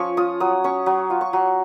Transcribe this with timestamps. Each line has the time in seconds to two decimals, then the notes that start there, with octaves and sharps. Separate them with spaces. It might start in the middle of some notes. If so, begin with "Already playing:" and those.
Already playing: F3 C#4 C#6
0.17 F4 D#6
0.40 F#3 D#6
0.64 C#4 C#6
0.86 F#3
1.10 F4
1.21 C#6
1.33 F#3